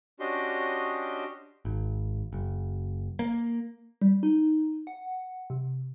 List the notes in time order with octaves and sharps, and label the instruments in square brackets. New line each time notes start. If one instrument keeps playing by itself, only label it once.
[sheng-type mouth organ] C#4 D4 F#4 G4 D#5 C6
[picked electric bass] G#1
F#1
A#3
[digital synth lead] G3
D#4
F#5
C3